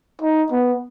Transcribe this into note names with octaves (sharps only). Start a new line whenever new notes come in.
D#4
B3